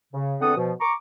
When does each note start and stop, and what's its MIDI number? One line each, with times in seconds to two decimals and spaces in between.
0.14 0.35 49
0.41 0.55 40
0.41 0.55 50
0.41 0.55 60
0.41 0.55 69
0.41 0.55 78
0.41 0.55 87
0.56 0.72 47
0.56 0.72 53
0.81 0.92 82
0.81 0.92 85
0.81 0.92 86